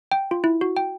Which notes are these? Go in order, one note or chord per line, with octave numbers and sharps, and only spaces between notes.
G5
F4
E4
F#4
G5